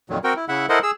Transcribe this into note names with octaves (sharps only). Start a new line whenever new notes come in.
F2 A#2 D#3 F#3
C4 F#4 A#4 G5
E4
C#3 E4 E5 F#5
E4 A4 A#4 C5 D#5 F#5
G#4 E6